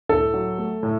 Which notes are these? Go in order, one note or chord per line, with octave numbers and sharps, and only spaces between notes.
A2 A4
F#3
A3
A2